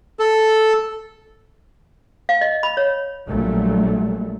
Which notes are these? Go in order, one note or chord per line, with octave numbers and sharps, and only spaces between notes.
A4
F5
D#5
B5
C#5
A#1 A#2 F#3 G3 A3